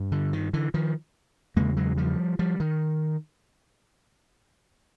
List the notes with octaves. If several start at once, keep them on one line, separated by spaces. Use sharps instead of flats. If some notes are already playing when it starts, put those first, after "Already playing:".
Already playing: G2
D3
D#3
D3 E3
D#3 F3
E2 C#3 G#3 A#3
F#3 G#3
F3 G3
F3 G3
D#3